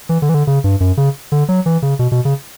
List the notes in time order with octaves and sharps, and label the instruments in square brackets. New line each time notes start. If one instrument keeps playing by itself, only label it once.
[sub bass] E3
D3
E3
D3
C#3
G2
F#2
C#3
D3
F#3
E3
C#3
B2
B2
C#3